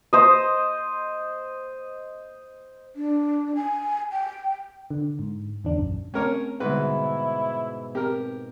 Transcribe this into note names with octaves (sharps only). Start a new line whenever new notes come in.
C5 D#5
D4
G#5
G5
D3
G#2
E2 D3 D4
A#1 F#2
A3 C4 C#4 A#4 C#5
G#2 B2 D3 G3 E4 B4 C6
C4 G4 A#4